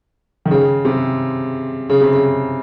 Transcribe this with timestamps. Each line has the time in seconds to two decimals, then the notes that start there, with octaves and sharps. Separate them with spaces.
0.45 D#3
0.51 C#3
0.85 C3
1.89 C#3
2.01 C3
2.13 C#3